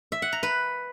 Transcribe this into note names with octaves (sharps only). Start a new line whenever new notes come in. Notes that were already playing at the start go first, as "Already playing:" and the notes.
E5
F#5
A#5
B4